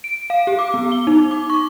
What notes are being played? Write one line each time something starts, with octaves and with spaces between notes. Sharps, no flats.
D7
F5
G4
D6
B3
G7
D#4
D6
C#6